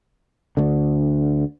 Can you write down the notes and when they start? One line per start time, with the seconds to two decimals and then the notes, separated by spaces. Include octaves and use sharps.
0.57 D2 D3